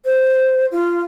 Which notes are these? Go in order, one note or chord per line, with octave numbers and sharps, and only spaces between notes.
C5
F4